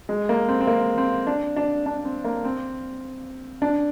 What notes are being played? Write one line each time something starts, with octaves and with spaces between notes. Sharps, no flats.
G#3
A#3
C4
C4
A#3
C4
D4
D4
D4
C4
A#3
C4
D4